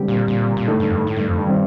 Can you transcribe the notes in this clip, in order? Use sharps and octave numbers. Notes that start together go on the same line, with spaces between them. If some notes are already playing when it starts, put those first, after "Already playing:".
Already playing: D3 G3 C4 G4
A#2
A#2
A#2
A2 D3 A3 D#4 A4
G2
F2
G2
A2
G2
F2
G2
D#3 G3 C4